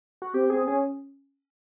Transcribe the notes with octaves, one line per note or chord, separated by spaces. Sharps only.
F#4
C4 G4
C4 G#4
C#4 G#4